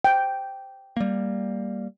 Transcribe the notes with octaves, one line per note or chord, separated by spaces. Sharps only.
G5
G3 A#3